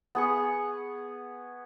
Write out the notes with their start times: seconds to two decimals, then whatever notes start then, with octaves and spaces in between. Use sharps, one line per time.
0.15 B3 G#4 C#6